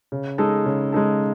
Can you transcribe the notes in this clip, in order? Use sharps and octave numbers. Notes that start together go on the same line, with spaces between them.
C#3
G#3 D#4 A4
C#3
G#3 D#4 A4